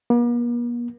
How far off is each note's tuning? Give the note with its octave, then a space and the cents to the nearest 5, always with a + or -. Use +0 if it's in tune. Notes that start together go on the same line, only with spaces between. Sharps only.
A#3 +45